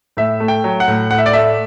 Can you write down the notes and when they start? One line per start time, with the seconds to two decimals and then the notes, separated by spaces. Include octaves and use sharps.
0.17 A2 E5
0.40 A3
0.48 G5
0.64 F#3
0.80 F#5
0.88 A2
1.11 A2 F#5
1.18 E5
1.26 D5
1.33 A3 E5